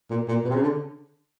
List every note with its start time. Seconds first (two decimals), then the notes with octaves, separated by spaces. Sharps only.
0.10 A#2
0.28 A#2
0.45 B2
0.50 C3
0.54 C#3
0.62 D3